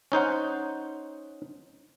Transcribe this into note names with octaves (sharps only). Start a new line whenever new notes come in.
C#4 D#4 C5 F#5